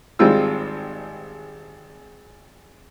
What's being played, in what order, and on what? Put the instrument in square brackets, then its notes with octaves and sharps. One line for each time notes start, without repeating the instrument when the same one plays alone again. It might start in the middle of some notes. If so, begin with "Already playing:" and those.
[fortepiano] G#1 G3 G#3 C4 F4 E6